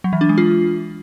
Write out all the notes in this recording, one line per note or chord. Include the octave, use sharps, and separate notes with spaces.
F#3
E3
D4
G#3
F4